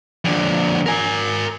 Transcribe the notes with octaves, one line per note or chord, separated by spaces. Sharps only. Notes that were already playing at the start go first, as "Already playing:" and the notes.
F2 D3
A#4 G#5